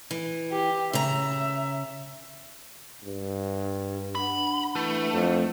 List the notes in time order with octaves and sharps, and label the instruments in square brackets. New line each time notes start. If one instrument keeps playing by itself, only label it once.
[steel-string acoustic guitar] E3
[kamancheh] G4
[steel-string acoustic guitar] C#3 A#5 [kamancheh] E5
[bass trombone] G2
[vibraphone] D4 F#5 [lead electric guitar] B5
[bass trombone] E3 [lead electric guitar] A3
[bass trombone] F2